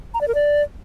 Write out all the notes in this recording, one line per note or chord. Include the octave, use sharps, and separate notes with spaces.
A#5
D5
A#4
D5